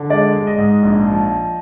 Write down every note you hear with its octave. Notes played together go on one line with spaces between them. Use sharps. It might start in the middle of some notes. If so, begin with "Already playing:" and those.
Already playing: D3
G#3 D5
G#3
D#5
G#2
A#1
F3